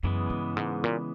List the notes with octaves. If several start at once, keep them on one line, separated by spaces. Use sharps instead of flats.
F#2 C#3 E3 G#3 B3
G2
G#2
A#2